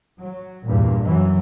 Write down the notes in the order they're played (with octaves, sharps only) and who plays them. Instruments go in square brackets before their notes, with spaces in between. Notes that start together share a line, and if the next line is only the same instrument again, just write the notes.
[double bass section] F#3
E2 G2 A#2
F#2 E3 F#3